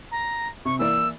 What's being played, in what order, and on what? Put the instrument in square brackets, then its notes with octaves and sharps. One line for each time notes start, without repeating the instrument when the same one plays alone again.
[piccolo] A#5
[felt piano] C3 [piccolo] C#6
[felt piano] E3 A#3 D5 [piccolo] E6